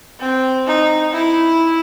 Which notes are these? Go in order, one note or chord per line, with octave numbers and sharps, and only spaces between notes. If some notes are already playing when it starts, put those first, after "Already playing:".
C4
D#4
E4